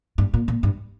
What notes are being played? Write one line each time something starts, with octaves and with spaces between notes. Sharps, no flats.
G2
A#2
A#2
G2